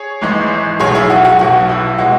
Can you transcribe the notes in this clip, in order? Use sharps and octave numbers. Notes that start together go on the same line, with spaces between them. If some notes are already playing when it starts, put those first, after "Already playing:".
Already playing: G#4 C#5
G#1 G#2 E3 G#3
B1 B2 F#3 G#4 C#5
E4 G#4
F#4
F#4
B1 B2 F#3 F#4
E4
B2 G#3 F#4